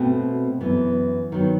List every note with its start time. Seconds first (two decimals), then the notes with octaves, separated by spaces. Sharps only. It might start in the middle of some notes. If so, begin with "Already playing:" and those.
Already playing: B2 A3 C4
0.60 F#2 E3 B3
1.32 D#3 F#3 B3